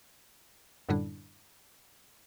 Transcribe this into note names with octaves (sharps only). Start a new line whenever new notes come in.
F#2 A2 D3 G3 D4 E4